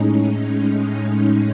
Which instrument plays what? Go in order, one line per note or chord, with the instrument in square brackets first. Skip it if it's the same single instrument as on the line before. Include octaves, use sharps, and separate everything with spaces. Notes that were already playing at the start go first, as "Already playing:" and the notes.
Already playing: [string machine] A2 G#3 C#4 D#4